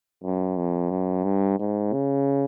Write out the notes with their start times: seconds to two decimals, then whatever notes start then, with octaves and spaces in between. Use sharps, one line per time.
0.24 F#2
0.57 F2
0.90 F#2
1.24 G2
1.59 G#2
1.93 C#3